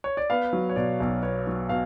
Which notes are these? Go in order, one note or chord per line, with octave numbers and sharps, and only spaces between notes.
C#5
D5
B3 F5
F#3
C#5
B2 D5
B1
B3 C#5
F#3
B2 F5